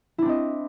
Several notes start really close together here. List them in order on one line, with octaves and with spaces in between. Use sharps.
E4 D4 C4 D#5